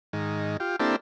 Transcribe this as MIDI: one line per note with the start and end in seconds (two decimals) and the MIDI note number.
0.13 0.57 44
0.13 0.57 51
0.60 0.76 65
0.60 0.76 67
0.80 0.96 58
0.80 0.96 60
0.80 0.96 62
0.80 0.96 64
0.80 0.96 67
0.80 0.96 69